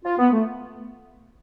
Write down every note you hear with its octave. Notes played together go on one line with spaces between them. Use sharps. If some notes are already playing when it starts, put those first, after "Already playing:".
F4
B3
A3